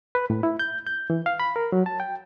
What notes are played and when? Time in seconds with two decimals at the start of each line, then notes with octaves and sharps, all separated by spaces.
0.15 B4
0.30 A2
0.43 E4
0.59 G6
0.87 G6
1.10 E3
1.26 F5
1.40 B5
1.56 A#4
1.72 F#3
1.86 A5
2.00 G5